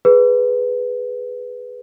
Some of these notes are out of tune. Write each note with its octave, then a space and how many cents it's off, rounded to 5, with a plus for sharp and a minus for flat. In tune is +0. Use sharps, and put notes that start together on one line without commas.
G#4 +0 B4 +0